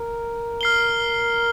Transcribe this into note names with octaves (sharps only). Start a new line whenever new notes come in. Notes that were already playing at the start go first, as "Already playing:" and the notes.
Already playing: A#4
F6 C7 G7